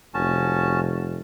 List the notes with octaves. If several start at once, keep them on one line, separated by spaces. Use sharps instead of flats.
F1 C#4 F#4 A5